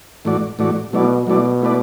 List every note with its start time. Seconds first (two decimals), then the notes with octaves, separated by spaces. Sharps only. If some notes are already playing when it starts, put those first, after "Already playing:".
0.25 A2 E3 A3 F#4 D5
0.59 A2 E3 A3 F#4 D5
0.92 B2 F#3 A3 E4 D5
1.27 B2 F#3 A3 E4 D5
1.62 A3 E4 B4 D5